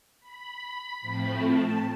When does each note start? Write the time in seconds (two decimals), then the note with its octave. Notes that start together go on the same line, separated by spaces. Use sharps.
0.20 B5
1.01 A2 F3 A3 C4
1.41 A5